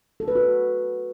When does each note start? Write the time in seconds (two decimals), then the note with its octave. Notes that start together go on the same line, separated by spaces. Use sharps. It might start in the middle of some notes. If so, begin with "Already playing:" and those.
0.20 A4
0.28 B4
0.35 F#4